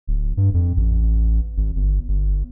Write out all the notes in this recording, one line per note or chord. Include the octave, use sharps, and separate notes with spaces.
D1
G2
F2
A1
G#1
G1
G1